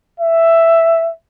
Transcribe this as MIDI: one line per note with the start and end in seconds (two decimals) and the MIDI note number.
0.20 1.12 76